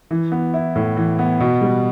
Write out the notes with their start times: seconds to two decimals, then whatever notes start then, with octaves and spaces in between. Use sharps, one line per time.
0.11 E3
0.32 B3
0.54 E4
0.76 A2
0.97 E3
1.19 B3
1.40 B2
1.62 G3